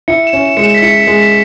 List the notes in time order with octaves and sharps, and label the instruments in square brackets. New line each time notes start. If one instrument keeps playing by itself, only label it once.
[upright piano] E4 [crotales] C#7
[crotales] E7
[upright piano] C#4
[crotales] E7
[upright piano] G#3 [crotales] C#7
[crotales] E7
B6
[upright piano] E4 [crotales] C#7
[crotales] C#7
[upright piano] G#3
[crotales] B6